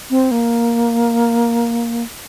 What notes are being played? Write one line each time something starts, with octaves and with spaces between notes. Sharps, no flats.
C4
A#3